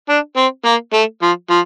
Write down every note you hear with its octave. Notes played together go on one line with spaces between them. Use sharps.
D4
C4
A#3
A3
F3
F3